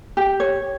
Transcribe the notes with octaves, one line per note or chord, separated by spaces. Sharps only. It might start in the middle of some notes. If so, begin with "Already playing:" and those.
G4
C#5